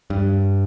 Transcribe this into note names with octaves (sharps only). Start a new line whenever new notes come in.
G2